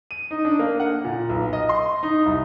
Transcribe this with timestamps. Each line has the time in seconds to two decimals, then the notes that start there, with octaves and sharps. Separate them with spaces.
0.11 D#7
0.31 D#4
0.45 D4
0.59 A#3
0.80 F#5
1.05 A#2
1.29 B1
1.53 D#5
1.69 C6
2.03 D#4
2.26 C2